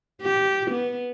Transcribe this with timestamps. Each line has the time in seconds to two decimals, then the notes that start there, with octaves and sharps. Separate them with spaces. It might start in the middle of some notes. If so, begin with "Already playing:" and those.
0.22 G4
0.71 B3